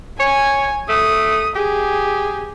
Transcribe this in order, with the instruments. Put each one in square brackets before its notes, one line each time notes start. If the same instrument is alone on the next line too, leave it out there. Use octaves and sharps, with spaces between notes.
[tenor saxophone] C#5 [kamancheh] G#5
[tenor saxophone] A3 [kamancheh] D#6
[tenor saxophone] G4 [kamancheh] G#4